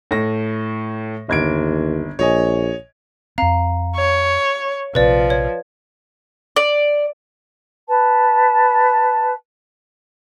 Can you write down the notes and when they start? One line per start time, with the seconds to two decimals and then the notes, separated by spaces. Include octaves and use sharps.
0.11 A2 A#6
1.29 G1 D#2 G#6 D7
2.19 A#1 C#5 D#5 G#5
3.38 F2 C4 F5 A#5
3.96 C#5
4.95 A#1 C3 F3 B4 D5
5.30 C#5
6.56 D5
7.88 B4 A5